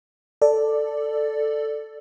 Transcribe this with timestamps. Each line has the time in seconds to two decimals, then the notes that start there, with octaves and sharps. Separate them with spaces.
0.42 A4 D5